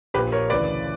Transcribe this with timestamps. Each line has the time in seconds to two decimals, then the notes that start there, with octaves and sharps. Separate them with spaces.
0.14 A#1 A#2 G4 B4
0.32 A#4 C#5
0.50 D2 C#3 E3 B4 D5